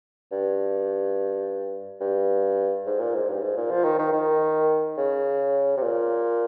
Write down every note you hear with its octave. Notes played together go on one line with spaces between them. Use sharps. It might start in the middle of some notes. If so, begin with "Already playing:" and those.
G2
G2
G#2
A#2
G#2
G2
G#2
A#2
F3
D#3
D#3
D#3
C#3
C3
A#2